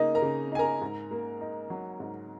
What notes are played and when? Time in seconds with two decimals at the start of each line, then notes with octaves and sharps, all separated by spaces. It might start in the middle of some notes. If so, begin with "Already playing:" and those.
Already playing: C#3 A#3 D#4 D#5
0.15 A#4 A#5
0.22 C#3
0.52 D#4 G#5
0.59 A#4 A#5
0.81 G#2
1.11 A#3
1.41 D#4
1.70 F#3
2.00 G#2